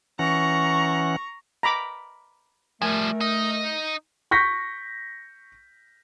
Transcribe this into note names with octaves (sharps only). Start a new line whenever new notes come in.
E3 C#4 F#5 A#5 C#6
A#5 B5 D6
F3 G3 A3 A#4 G#5
D#4 D#5
C#6 G6 A#6 B6